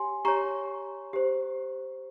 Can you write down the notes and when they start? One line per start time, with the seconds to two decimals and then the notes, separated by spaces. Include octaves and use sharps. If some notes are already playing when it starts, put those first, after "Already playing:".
Already playing: G4 C#5 G#5 C6
0.25 G4 C#5 A#5 C#6
1.13 G4 C5